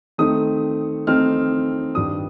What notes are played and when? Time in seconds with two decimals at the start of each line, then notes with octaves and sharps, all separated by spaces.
0.18 D#3 A3 C4 D#4 D#6
1.07 D#3 A3 C4 D#4 F6
1.95 G2 D#3 G3 D4 D#6